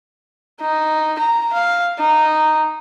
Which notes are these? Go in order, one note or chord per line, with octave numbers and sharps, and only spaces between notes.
D#4
A#5
F5
D#4